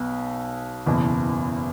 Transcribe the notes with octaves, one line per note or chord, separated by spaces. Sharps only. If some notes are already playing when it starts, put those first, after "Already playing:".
Already playing: B1 B2
F#1 E2 B2